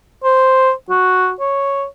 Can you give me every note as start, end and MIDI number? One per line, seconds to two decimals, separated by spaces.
0.24 0.72 72
0.90 1.32 66
1.40 1.85 73